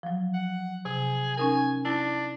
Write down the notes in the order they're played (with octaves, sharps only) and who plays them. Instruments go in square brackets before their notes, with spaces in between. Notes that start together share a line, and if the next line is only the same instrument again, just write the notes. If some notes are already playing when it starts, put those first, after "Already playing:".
[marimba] F3 F#3
[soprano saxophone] F#5
[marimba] C3 [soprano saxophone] G#4
[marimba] C#4 D#4 A#4 [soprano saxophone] G#5
[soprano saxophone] D4 [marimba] E4 A5